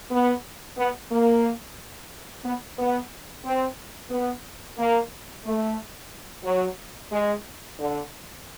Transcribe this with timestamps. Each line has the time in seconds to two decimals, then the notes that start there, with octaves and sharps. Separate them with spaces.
0.11 B3
0.78 B3
1.11 A#3
2.44 B3
2.77 B3
3.45 C4
4.11 B3
4.78 A#3
5.45 A3
6.44 F#3
7.11 G#3
7.79 D3